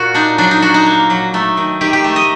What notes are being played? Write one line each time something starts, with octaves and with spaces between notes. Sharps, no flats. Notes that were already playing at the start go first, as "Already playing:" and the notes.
Already playing: A#2 F#4
D4 D#4
F#3 D4
D#4
D4 F#4
D#4
A#3
F#3
A3
D#3
D#3 G4
G4
A3
D#5